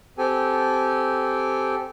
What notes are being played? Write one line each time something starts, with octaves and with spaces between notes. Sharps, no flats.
C4 G4 A4 G#5